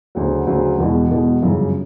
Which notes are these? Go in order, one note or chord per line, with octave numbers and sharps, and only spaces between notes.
D2 C#3 F#3
D2 C#3 F#3
E1 E2 B2
E1 E2 B2
G1 F#2 C#3